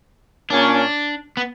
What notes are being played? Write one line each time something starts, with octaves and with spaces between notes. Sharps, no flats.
A#2 A#3 C#4 D4
B3